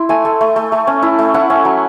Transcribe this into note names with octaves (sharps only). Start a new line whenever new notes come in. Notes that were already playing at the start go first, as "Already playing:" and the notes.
Already playing: E4 C6
A3 G#5
A3
A3
A3
A3
C#4
E4
A3
E4 F#5
C#4
F#3